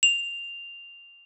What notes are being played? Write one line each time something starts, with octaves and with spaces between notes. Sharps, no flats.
F7